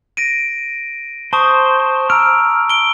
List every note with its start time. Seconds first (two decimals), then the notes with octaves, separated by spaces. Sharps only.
0.17 A#6 D7 D#7
1.33 C5 A5 C#6 D#6
2.10 A#5 E6 F6 D7
2.70 D7 G7